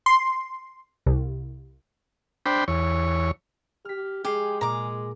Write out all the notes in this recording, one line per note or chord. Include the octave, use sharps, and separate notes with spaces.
C6
C2
D4 C5 G5 B5
E2 C#5
G4 F6 B6
G#3 G4 G#4 C7
A#2 A#5 D6